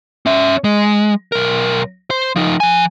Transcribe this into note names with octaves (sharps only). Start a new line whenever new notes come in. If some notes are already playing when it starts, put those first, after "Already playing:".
C#4 E5
G#3
B1 A#4
C5
F3 D#4
F3 G#5